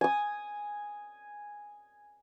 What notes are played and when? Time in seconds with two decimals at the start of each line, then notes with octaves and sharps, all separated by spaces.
0.01 G#5 D#6